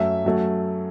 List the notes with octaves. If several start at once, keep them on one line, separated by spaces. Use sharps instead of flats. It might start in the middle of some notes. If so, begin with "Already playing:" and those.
Already playing: F#2 F#3 A3 E5
F#2 F#3 A3